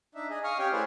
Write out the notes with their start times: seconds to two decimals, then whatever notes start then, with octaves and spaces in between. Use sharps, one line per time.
0.15 D4 D#4 E5
0.30 G#4 D#5
0.44 F5 C#6 D#6 F6
0.59 C#4 G4 C#5 F5 G5
0.72 A3 E4 G#4 B4 C5 D5